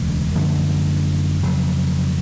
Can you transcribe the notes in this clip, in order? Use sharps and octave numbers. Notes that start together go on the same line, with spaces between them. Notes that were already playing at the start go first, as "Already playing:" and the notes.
Already playing: E1 D2 C#3
F#2 D3 F3 A3
F2 C#3 F#3